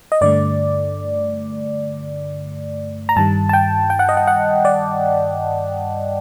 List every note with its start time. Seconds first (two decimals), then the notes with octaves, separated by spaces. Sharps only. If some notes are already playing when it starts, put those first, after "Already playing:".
0.12 D#5
0.21 G2 D3 A3 D5
3.09 A#5
3.16 G2 D#3 G3 A5
3.49 A5
3.53 G5
3.90 G5
3.99 F#5
4.09 D#5
4.17 F#5
4.27 F#5
4.65 D5